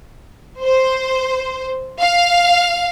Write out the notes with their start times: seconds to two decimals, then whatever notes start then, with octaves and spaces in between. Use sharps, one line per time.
0.61 C5
2.00 F5